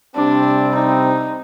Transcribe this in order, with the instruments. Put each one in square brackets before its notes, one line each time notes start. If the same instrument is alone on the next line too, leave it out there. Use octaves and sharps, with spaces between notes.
[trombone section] C3 G3 C4 [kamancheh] D4
[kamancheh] D#4